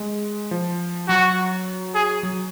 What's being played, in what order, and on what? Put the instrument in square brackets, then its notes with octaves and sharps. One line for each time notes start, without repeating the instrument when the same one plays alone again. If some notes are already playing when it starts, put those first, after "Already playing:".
Already playing: [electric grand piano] G#3
F3
[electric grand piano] F#3 [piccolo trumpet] F#4
[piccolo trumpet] G#4
[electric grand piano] F#3